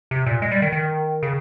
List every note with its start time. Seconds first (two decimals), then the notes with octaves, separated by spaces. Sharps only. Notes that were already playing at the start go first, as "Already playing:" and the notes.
0.11 C3
0.26 A#2
0.42 G#3
0.51 G3
0.62 D#3
0.72 D#3
1.23 C#3